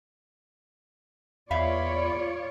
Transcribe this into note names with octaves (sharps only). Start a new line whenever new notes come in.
E2 F4 C#5 D5 E5 F5 B5